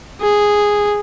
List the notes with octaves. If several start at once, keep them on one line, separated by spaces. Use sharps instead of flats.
G#4